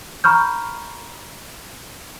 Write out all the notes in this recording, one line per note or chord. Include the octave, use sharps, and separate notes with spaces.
A#5 B5 C#6 F6 G6